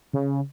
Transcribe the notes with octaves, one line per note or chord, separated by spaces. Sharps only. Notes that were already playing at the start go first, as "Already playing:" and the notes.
C#3